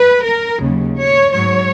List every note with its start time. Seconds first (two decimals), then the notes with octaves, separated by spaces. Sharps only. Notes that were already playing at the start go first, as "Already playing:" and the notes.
Already playing: B4
0.25 A#4
0.60 D#2 C#3 F#3
0.96 C#5
1.31 G#2 F#3 C#5